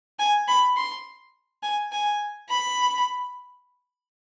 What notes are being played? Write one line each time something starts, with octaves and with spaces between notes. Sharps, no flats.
G#5
B5
C6
G#5
G#5
B5